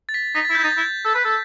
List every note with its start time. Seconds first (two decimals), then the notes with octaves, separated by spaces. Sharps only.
0.09 A6
0.14 B6
0.35 D#4 B6
0.45 E4 A6
0.55 E4 G6
0.64 D#4 A6
0.77 E4
1.05 A4
1.15 B4
1.25 A4